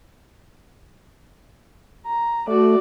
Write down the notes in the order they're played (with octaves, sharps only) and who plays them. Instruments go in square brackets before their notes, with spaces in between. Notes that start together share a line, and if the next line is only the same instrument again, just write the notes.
[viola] A#5
[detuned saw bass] A3 [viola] F#4 D5